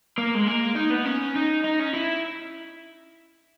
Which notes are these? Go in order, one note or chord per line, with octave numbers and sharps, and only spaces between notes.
A#3
G#3
A#3
D#4
B3
C#4
D#4
D#4
C#4
E4